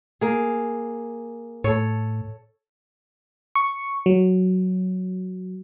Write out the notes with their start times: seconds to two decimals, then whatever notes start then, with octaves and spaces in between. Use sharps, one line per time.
0.21 A#3 G#4
1.64 A2 A4 C#5
3.55 C#6
4.06 F#3